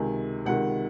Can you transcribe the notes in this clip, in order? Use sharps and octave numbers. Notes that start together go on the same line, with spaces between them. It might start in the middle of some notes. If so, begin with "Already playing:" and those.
Already playing: C#2 C3 D#3 G#5
C#2 C3 D#3 F#5